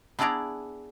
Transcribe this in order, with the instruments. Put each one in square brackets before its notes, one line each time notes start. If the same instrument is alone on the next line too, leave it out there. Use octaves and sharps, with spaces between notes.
[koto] B3 D4 E4 G#4 D5 A#5